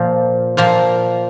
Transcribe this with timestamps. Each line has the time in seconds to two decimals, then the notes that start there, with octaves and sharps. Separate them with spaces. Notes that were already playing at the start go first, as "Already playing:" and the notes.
Already playing: A#2 F3 A#3
0.57 A#2 F3 A#3